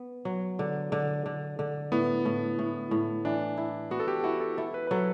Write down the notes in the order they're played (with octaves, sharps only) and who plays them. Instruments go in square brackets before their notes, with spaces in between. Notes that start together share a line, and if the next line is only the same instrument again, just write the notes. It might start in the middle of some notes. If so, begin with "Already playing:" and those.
Already playing: [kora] B3
F#3
D3
D3
D3
D3
[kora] A2 [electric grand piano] B3
[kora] A2
A2
A2
[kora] E3 [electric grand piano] D4
[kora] E4
[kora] B3 [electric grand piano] F#4
[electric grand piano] A4
G4
[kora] E4 [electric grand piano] F#4
[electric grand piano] A4
[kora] E4 [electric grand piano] A4
[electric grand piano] B4
B4
[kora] F#3 [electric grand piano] A4